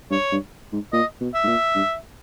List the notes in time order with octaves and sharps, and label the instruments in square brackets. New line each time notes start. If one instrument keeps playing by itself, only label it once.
[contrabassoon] G2 [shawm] C#5
[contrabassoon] G2
G#2
[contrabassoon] A#2 [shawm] D#5
[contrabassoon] B2
[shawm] E5
[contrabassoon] G#2
A#2
G2